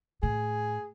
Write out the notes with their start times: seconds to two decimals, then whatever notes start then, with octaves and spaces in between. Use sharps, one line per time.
0.23 A2 G#4